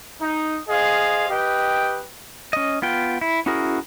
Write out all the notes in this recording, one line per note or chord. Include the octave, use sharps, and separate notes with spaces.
D#4
G#4 C5 D#5 F5
G4 B4 D#5 G5
C#4 D#5
B3 F4 G5
E4
C#4 E4 F#4 G#4 A#4